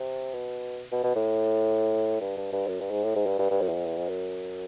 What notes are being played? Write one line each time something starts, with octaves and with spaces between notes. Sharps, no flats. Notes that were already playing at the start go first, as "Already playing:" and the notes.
Already playing: C3
B2
B2
B2
A2
G2
G2
G2
F#2
G2
G#2
A2
G#2
G2
G2
G2
F#2
E2
F2
E2
F2
F#2